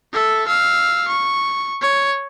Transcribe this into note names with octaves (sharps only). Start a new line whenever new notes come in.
A4 E5
F5 E6
C#6
C#5